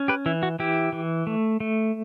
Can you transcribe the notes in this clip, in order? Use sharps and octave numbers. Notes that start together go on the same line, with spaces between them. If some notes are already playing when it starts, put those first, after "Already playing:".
Already playing: C#4
G4 B4
E3 E4
F#4
E3 E4 G4
E3
A3
A3